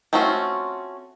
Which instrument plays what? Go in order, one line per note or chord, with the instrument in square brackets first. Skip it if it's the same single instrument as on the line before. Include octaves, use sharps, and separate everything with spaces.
[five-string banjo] A3 C4 C#4 F4 F#4